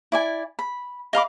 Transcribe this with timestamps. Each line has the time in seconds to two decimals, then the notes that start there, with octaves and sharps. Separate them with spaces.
0.12 E4 D5 G#5
0.59 B5
1.13 D#5 F5 B5 D6